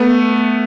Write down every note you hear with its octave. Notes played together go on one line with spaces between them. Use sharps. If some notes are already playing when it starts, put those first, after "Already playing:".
Already playing: A3 B3